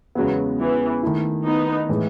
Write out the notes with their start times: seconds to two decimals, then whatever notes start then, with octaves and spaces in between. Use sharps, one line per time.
0.15 E2 C#3 F#3 G#3 B3
0.59 E3
1.03 D#3 A3 E4
1.45 B3 D#4
1.89 A2 E3 G#3